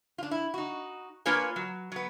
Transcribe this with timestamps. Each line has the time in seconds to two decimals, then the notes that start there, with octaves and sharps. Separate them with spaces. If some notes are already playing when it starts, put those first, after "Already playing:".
0.18 D4 F4
0.31 E4
0.54 D#4 F#4
1.25 A#3 D4 F4 B4 C#5 G#5
1.56 F#3
1.92 F#3 B3